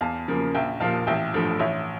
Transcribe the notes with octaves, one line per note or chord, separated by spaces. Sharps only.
E2 F5 A5
C#3 F3 A#3
A#1 E5 G5
A#2 F3 F5 A5
A1 E5 G5
G2 F3 A3
A1 C#5 E5